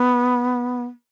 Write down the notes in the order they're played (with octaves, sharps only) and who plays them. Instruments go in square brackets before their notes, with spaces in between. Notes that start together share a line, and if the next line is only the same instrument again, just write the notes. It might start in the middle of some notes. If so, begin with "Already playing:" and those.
Already playing: [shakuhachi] B3